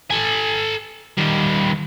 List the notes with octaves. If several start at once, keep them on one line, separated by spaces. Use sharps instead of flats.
A4 G#5
D#3 G3